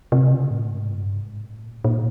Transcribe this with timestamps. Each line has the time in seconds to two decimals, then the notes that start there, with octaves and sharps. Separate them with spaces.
0.12 C3
0.32 C#3
0.51 A2
0.69 G#2
0.89 G2
1.15 G#2
1.40 A2
1.66 A#2
1.84 A#2